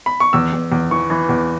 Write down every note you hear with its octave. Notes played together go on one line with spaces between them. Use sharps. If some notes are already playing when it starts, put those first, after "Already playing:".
B5
C#6
E2 E6
E2
E2
E3 C#6
E3
E2